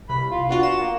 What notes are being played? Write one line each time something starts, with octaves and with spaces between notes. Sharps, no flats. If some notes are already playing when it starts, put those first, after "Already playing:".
C2 B5
F4
B3 D4 F4 F#4
E7
A#3